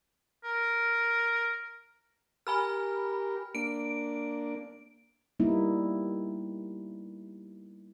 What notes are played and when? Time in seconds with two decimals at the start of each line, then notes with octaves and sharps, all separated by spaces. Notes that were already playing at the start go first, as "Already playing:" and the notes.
0.44 A#4
2.47 G4 A#4 G#5 B5 F6
3.55 A#3 D4 D7
5.40 G3 A#3 B3 D#4 E4